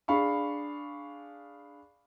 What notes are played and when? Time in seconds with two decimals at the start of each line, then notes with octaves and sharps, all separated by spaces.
0.08 D4 G#4 F5 B5 C#6